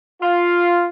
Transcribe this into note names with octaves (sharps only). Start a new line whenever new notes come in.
F4